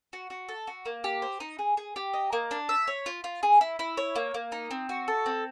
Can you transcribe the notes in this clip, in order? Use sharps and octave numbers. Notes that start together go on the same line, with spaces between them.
F#4
F#4
A4
F#4
A#3
G4
C5
D#4
G#4
G#4
G4
D#5
A#3
D4
E5
C#5
F4
F4
G#4
E4
E4
C#5
A#3
A#3
D#4
C4
F#4
A4
C4